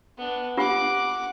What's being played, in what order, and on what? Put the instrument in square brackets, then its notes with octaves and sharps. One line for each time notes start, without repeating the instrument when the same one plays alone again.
[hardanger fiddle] B3 D4
[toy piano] D4 F4 G4 [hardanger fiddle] F#5 D6